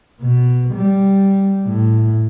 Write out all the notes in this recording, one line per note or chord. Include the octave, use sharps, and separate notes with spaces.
B2
G3
A2